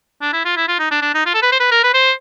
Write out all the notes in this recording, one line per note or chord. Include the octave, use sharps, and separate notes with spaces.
D4
E4
F4
E4
F4
D#4
D4
D4
D#4
F4
A4
B4
C5
B4
A#4
B4
C5